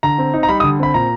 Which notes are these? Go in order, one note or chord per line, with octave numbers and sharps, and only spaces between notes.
D3 A#5
C4
D#4
A#5
G3 B5
D#6
D3
C4 B5
A#2 A#5